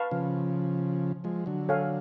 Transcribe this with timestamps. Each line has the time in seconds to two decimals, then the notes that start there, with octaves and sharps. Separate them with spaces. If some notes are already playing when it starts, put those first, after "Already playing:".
Already playing: B4 F5 A5 C#6
0.11 C#3 F3
1.24 F3 G#3
1.46 D3 F#3
1.69 A4 C#5 F5 G#5